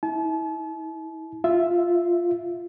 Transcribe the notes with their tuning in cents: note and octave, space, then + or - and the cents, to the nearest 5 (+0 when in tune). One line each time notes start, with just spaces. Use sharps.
E4 -35 A5 -40
F4 +0 E5 +0